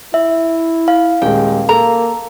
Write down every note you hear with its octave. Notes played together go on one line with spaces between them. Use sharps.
E4 E5
F5
D#1 G#3 G5
A#3 A4 A#5